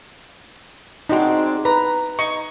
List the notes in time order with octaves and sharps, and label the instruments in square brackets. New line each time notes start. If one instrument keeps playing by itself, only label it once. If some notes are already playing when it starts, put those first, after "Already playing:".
[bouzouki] G#3 C4 D4 [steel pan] D#4 F#4
[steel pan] B4 [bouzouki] A#5
[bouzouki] D#4 [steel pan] C#6